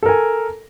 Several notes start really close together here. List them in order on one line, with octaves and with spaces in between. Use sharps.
A4 A#4 G#5